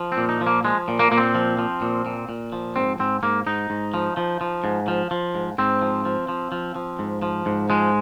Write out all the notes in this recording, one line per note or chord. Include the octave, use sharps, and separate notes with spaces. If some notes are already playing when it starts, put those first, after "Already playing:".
Already playing: F3
C4
A#2
D#4
F3
A#3
F3 G#3
A#2
A#3
A#2 A#3
C4
F3
F3
A#2
A#2
A#2
F3
G#2 C4
G#2 C4
G#2 A#3
G#2 D#4
G#2
F3
F3
F3
G#2
F3
F3
G#2
G#2 C4
F3
F3
F3
F3
F3
G#2
F3
G#2
F3 G#3